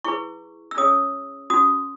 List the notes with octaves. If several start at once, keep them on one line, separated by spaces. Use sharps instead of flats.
E4 G#4 B4 C#6
E6
C#4 G#4 C#5 D#6
C#4 F#4 A4 D#6